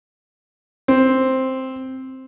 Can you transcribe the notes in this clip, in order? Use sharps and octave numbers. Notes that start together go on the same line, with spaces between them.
C4